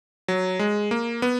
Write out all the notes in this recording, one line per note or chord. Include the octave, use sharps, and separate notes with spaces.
F#3
G#3
A#3
B3